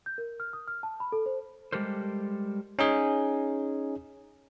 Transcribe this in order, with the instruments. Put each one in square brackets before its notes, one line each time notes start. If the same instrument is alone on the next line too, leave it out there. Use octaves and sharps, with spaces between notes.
[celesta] G6
A#4
F6
D#6
F6
A5
B5
A4
C5
[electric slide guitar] G3 G#3 G4 A4 A#4 C5
[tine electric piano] C#4 D#4 G#4